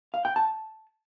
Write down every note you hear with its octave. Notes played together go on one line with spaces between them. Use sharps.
F5
G5
A5